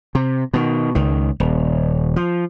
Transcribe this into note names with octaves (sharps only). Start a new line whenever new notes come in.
C3
B2 D#3
C#2 D#3
D#1
F3